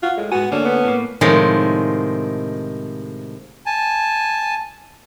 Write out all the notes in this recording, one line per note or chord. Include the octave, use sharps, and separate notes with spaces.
F4 F#4
A2 G#3
G#2 B3 F#4 G#5
D2 A#3 C#4 D4 A4
B3
A2 A#3
A2 C3 D#3 F3 G#3
G#5 A5